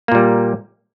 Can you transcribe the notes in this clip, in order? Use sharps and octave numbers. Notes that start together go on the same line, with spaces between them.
A#2 G3 A#3